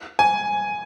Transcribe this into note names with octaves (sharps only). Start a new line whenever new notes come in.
G#5